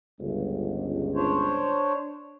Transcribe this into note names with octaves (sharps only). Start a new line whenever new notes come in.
G1 C#2
D4 C5 C#5